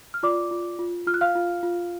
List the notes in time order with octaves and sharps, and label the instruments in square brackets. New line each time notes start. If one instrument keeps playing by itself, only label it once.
[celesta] F6
F4 D5 D6
F4
F4
F4 F6
F#6
F5 F6
F4
F4